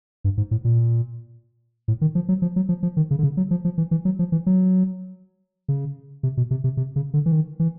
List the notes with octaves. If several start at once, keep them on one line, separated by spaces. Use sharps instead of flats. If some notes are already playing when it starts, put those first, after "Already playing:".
G2
G#2
A2
A#2
A2
D#3
F3
F#3
F3
F#3
F3
F3
D#3
C#3
D3
C#3
F#3
F3
F3
E3
E3
F#3
F3
E3
F#3
C#3
C3
B2
C3
C3
C3
C#3
D3
E3
D#3
E3